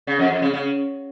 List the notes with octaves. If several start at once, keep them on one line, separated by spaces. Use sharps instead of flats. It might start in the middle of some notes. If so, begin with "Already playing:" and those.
C#3
F2
F2
C#3
C#3